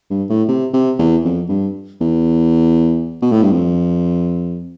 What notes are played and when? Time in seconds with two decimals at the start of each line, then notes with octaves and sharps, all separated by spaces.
0.10 G2
0.29 A2
0.48 C3
0.73 C3
0.99 E2
1.25 F2
1.49 G2
2.01 E2
3.22 B2
3.32 A2
3.42 G2
3.52 F2